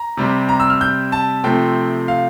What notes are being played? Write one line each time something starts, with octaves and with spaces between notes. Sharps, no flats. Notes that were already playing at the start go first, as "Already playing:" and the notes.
Already playing: A#5
C3 G3 C4
A#5
E6
F6
G6
A5
C3 F3 A3 C4 G5
F5